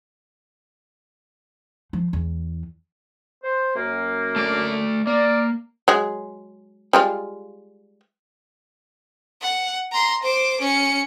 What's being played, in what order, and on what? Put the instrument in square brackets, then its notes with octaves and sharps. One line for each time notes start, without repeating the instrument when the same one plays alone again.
[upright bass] F3
E2
[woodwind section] C5
F#2 A#3
[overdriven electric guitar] A3 D5
[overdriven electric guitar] A#3 [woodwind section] D5
[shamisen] F#3 G#3 G#4
G3 G#3 F4
[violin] F#5
A#5 C6
C5 D6
C#4 C#7